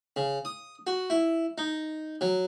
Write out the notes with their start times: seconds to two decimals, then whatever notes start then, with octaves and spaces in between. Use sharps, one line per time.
0.16 C#3
0.45 D#6
0.87 F#4
1.10 E4
1.58 D#4
2.21 F#3